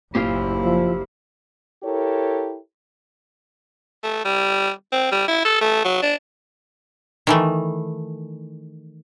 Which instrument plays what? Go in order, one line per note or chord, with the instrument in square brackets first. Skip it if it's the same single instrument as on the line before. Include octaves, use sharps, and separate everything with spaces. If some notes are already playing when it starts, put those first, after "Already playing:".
[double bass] F#1 E4 [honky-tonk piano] A#2 [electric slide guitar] G4 C5 F5
[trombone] F3
[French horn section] E4 G4 A4 A#4 C#5
[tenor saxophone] A3
G3
C4
G3
E4
A4
A3
F#3
D4
[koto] D#3 E3 A3